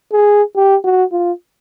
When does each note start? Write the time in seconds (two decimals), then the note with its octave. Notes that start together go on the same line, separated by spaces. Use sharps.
0.13 G#4
0.56 G4
0.84 F#4
1.12 F4